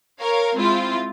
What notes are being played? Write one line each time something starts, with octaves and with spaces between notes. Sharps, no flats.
A#4 C#5 F5
G#3 C4 E4 F4